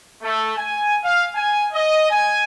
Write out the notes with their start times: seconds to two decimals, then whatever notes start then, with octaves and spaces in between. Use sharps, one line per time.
0.23 A3
0.57 G#5
1.04 F5
1.35 G#5
1.73 D#5
2.10 G#5